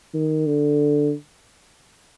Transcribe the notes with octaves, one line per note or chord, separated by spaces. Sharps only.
D#3
D3